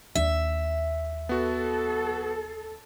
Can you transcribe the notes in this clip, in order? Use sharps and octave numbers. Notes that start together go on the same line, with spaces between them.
D#2 D4 E5
B3 F#4 A4